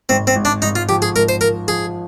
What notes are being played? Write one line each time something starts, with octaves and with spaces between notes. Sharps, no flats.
G#1 C4
C4
G#1
D4
G#1 D#4
F4
F3 G4
G#4
G#1 A#4
C5
F3 A#4
F3 G#4